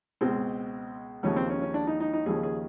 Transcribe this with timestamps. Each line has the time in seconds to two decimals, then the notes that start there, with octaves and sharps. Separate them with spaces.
0.21 C#2 B2 G#3 C4
1.23 D#2 C#3 F3 C#4
1.36 C4
1.50 C#4
1.62 C#4
1.74 D4
1.87 D#4
2.00 D#4
2.13 D#4
2.26 D#2 C#3 F3 G#4
2.43 G#4